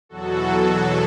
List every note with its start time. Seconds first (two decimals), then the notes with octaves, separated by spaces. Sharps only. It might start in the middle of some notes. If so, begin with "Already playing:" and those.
0.09 E2 B2 F#3 F#4 A4
0.50 F#4